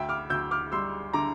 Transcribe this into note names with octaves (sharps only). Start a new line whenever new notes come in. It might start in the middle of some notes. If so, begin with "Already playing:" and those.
Already playing: D2 E5 G5
D6 F6
D2 E6 G6
D6 F6
G3 C6 E6
D3 A#5 D6